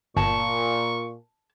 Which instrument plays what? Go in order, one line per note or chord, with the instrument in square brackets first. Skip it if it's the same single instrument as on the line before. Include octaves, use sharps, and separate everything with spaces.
[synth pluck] G1 [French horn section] A#2 [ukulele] A5 [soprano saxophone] C#6